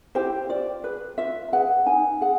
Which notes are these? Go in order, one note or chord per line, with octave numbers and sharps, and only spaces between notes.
E4 G4 C5
F4 D5
G#4 B4
F4 E5
G#4 B4 F#5
D#4 G#5
G#4 F#5